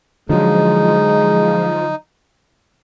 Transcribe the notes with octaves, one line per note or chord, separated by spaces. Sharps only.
D3 F3 F#3 G#3 D#4